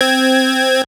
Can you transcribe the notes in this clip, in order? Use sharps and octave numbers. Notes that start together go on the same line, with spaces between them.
C4 G#6